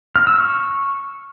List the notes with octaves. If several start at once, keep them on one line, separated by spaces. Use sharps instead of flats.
F6
E6
C#6